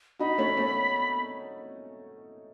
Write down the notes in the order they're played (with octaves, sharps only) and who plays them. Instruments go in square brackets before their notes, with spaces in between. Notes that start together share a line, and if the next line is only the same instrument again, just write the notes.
[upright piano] D#4 F#4 [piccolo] B5
[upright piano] A3 C#4
A3 C#4